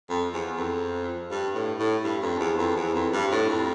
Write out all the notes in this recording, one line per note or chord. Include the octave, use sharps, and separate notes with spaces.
F2
E2
F2
G2
A2
A2
G2
F2
E2
F2
E2
F2
G2
A2
F2